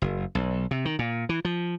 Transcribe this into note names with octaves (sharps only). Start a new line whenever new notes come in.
F#1
B1
C3
D#3
A#2
E3
F3